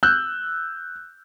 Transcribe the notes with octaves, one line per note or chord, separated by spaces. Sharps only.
E6 F#6 G6